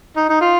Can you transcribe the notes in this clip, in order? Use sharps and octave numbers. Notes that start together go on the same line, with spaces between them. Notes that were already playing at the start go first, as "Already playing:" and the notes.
D#4
D#4
F4